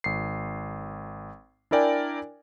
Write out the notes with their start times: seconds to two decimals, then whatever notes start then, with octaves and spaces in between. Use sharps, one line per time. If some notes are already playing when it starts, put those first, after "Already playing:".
0.04 G#1 C7
1.71 D4 E4 A#4 D5 G5 G#5